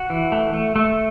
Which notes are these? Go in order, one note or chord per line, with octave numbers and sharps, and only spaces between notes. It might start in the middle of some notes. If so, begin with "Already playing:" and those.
Already playing: F#4
E3
A3
A3
A3